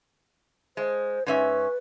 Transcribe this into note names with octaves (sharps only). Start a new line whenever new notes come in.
G#3 C5
G#2 C#4 B4 E5